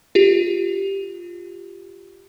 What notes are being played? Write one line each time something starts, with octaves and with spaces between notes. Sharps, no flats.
F4 G4